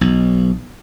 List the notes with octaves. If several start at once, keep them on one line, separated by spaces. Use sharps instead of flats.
B1